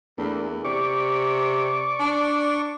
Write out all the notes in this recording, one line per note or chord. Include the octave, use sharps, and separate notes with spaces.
E2 A3 A#3 D4
C3 D5 C#6 D6
D4